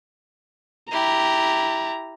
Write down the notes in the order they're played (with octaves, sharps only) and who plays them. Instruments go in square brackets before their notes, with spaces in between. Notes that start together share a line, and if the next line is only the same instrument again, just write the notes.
[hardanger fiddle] E4 G4 [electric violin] A#5